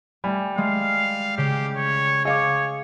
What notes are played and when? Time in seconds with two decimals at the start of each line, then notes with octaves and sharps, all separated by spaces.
0.24 G3 A3 G#5
0.58 G#3 A3 F5
1.38 C#3 G4
1.77 C#5
2.25 G#4 C#5 D#5 F5 D6